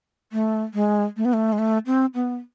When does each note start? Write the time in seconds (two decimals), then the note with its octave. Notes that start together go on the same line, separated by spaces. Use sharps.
0.32 A3
0.74 G#3
1.17 A3
1.25 B3
1.33 A3
1.53 G#3
1.59 A3
1.86 C4
2.14 B3